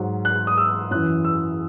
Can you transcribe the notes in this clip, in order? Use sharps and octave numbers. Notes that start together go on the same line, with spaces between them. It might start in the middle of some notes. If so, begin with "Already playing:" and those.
Already playing: G#2 F#3
F#6
D#6
E6
F#2 E3 F#6
E6